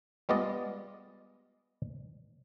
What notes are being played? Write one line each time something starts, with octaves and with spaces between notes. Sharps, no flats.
G3 G#3 B3 F4 D5 D#5